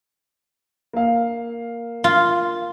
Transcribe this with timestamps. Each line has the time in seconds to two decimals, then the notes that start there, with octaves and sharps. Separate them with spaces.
0.93 A#3 F5
2.04 F4